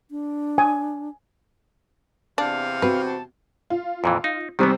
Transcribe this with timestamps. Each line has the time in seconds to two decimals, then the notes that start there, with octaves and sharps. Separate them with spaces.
0.11 D4
0.58 G#5
2.38 E2 C3 D4 F5
2.82 C4 F#4 B4
3.06 A5
3.70 F4
4.04 F2 A#2 E3
4.24 D#4
4.59 C3 D#3 E3 G3 B3 C4